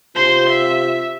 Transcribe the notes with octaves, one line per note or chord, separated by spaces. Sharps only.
C3 F4 C5 C6
E5